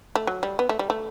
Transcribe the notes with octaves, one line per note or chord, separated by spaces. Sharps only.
A3
F#3
G3
B3
A3
G3
A3